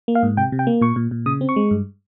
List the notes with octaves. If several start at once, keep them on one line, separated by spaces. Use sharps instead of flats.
A#3
F5
G#2
C3 G5
C3
G5
A#3
A#2 C#6
A#2
A#2
C#3 D#6
C4
C#6
G#3
G2